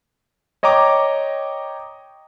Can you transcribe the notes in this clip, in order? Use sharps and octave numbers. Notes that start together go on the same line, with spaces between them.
C#5 D#5 G5 A#5 D6